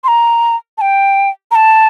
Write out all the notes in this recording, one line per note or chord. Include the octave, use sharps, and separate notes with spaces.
C6
A#5
A5
G5
A#5
A5